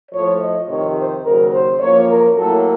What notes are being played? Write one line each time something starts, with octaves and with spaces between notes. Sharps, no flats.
A2 F3 A3 C#5
D#5
F2 C3 D#3 C#5
C5
D#2 C#3 F#3 A#4
C5
F#2 F3 A#3 C#5
A#4
A2 F#3 A#3 A4